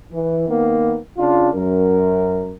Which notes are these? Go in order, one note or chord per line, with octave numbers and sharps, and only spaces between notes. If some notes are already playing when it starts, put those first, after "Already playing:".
E3
D#3 A#3 B3
C#3 D4 F4
F#2 A#4